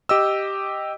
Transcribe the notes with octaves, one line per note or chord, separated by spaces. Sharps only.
G4 D#5 E6